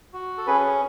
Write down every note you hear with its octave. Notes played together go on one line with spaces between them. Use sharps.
F#4
A4
C#4 G#4 B4